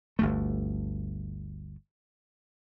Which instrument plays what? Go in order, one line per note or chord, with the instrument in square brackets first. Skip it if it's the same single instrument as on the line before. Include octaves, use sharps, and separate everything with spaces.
[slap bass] G1 D2 A3